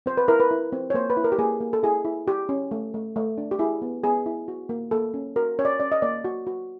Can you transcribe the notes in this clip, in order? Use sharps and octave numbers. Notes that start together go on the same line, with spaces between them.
C4 C5
B4
E4 A#4
B4
E4
C4
C#5
A#3 C5
B4
E4
A#4
G4
A#3 G#4
A#3
A4
E4 G#4
E4
E4 G4
C#4
A3
A3
A3
D4
G4
E4 G#4
B3
B3 G#4
E4
F#4
A#3
A#3 A4
C#4
F#4 A#4
C#4 C#5
D5
C#4 D5
D#5
A#3 D5
F#4
F#4